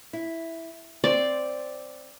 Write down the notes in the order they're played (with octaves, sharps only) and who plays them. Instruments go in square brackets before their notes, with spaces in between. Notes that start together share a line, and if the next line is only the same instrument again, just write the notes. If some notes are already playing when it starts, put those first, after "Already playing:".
[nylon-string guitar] E4
[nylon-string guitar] C4 C5 [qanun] D5